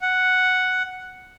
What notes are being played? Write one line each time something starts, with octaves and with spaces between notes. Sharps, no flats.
F#5